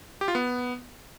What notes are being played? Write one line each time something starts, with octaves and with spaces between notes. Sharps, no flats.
G4
F4
B3